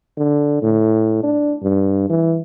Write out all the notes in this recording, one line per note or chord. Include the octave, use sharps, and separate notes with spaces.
D3
A2
D4
G2
E3